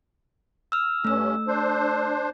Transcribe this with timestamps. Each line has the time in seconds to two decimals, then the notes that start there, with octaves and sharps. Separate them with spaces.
0.72 E6 F6
1.05 G2 A3 C#4 E6
1.47 D4 C5